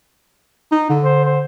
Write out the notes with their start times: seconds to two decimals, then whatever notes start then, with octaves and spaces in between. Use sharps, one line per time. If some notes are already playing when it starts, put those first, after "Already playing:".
0.72 D#4
0.90 D3
1.04 C5
1.24 C5